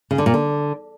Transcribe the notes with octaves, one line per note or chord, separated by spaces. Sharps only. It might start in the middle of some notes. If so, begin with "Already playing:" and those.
C#3
D3
A#2
D3